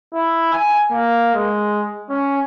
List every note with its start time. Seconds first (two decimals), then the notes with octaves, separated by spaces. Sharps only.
0.14 E4
0.53 G#5
0.91 A#3
1.34 G#3
2.10 C#4